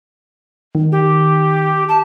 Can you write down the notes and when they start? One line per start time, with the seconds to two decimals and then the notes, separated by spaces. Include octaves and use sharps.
0.75 D#3
0.92 G4
1.89 A5